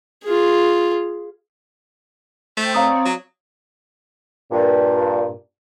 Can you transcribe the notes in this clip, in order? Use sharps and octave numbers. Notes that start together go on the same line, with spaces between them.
F4 G#4
A3 C5 G5
C4 C#5 D5 F5 A#5 D#6
F#3
G2 A#2